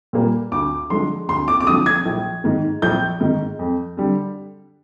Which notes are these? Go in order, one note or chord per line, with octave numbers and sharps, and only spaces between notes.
A#2 G3 A#3
D2 D6
D3 F3 G#3 C6
D2 C6
D6
D6
D3 F3 G#3 D#6
G#6
A#1
G#2 D#3
A#1 G6
G#2 D#3
F2
D3 G3